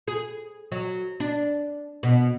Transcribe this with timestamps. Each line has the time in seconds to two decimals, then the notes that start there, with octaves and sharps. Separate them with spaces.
0.08 G#4
0.72 F#3
1.20 D4
2.03 B2